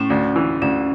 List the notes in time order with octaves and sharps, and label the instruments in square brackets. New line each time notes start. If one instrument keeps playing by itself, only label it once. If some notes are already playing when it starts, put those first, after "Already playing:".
Already playing: [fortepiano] A2 [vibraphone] C#4
[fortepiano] D2
E3
[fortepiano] D2 [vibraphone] C#4